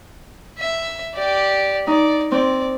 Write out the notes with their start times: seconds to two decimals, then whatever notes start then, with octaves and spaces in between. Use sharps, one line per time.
0.59 E5
1.15 G4 D5
1.87 D#4 D5
2.32 C4 D5